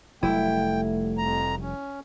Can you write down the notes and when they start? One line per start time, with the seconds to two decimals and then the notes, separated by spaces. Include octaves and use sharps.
0.23 F1 F#3 G3 A3 E4 G5
1.18 F2 A#5
1.61 C#4